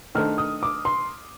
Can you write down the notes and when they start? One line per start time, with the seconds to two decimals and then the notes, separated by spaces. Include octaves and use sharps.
0.15 D#3 A3 D4 A4 C5 F6
0.38 D#6
0.63 D6
0.85 C6